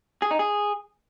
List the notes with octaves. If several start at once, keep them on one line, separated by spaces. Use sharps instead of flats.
G#4
D#4
G#4